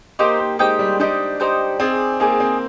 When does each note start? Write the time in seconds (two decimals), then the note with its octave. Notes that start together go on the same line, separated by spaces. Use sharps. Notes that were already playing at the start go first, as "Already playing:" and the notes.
0.19 A#3 D#4 G4 C5 G5
0.39 A#3
0.59 G#3 D#4 G4 C5 G5
0.79 G3
1.00 D4 D#4 G4 C5 G5
1.40 D#4 G4 C5 G5
1.80 C4 D#4 G#4 D5
2.20 A#3 D#4 G#4 D5
2.40 C4